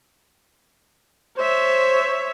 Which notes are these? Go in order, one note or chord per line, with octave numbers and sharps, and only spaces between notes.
C5 C#5 E5